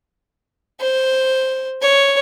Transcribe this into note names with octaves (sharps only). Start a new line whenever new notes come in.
C5
C#5